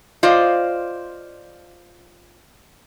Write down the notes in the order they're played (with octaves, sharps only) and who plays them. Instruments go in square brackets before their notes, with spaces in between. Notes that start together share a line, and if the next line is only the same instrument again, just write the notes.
[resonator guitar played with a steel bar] F4 C5 D5 D#5 F5